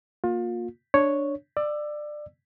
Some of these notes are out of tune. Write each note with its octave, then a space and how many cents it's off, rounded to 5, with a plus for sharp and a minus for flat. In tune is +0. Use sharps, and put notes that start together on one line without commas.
A#3 +0 F4 +30
D4 +0 C#5 +0
D5 +20 E6 +10